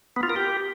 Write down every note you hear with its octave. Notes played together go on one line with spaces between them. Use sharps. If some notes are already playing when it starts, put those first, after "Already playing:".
B3
F4
A#4
G4